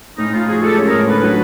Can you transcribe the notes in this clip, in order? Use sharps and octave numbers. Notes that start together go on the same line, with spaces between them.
A2 C#4 D#4
A2 D#4 F4
F3 F#4 G#4
G#3 G4 A4
C#4
G#4 A#4
A2
D3 A4 B4
F#3